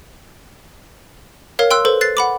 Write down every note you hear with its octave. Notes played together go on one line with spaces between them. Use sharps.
A#4 C#5 F5
G5 C6 E6 F#6
A4 B4 C5
F#6 A6 C7
F#5 B5 D6